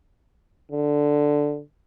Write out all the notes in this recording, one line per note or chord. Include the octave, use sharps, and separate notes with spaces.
D3